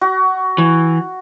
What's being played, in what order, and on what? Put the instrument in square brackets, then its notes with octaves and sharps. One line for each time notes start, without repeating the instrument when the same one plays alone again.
[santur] F#4
[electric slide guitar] E3